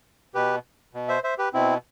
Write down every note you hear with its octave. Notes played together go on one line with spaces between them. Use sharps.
B2 G4 B4
B2
C5 E5
C5 E5
G4 B4
B2 C4 E4